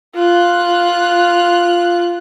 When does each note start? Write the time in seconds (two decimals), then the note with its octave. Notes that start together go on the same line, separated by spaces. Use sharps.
0.15 F4 F#6